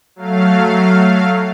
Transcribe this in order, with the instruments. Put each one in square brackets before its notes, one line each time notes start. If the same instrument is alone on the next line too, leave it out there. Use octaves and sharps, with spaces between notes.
[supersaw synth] F#3 A3 F5